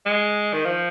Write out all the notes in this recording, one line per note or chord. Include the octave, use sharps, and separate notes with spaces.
G#3
D#3
F3